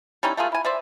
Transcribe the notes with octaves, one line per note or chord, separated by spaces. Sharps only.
G3 C#4 D#4 E4
A3 A#3 F4 G#4
E4 G#5
C5 D5 E5